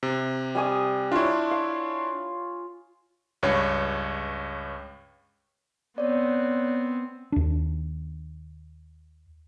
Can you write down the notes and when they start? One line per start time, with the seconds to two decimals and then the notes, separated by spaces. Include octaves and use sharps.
0.03 C3
0.55 G3 G#5 D#6
1.12 D4 E4 F4 C#5
1.51 F5
3.43 C#2 G2 C#5
5.98 B3 C4 C#5 D5
7.32 D#2 D4